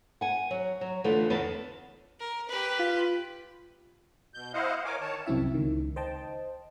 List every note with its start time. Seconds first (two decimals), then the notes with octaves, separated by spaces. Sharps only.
0.21 F#5 G#5
0.51 F#3
0.81 F#3
1.04 D3 E3 A3 B3 F4
1.30 E2 C#3 B3 E4 A5
2.19 A#4
2.48 G4 B4
2.79 F4
4.34 B2 G6
4.54 E4 C5 D#5 F5 F#5
4.85 A#4 C#5 G#5 D6
5.01 D#3 C#5 A5
5.26 C2 F#2 C4 E4 E5
5.54 C#2 D#3
5.96 C5 D#5 G5 A5